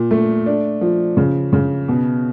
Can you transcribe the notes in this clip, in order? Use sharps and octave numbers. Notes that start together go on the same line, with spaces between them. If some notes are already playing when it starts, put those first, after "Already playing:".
Already playing: A#2
A3
D4
F3
C#3
C#3
B2